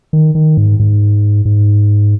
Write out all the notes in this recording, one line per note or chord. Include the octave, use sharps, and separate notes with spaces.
D#3
D#3
G#2
G#2
G#2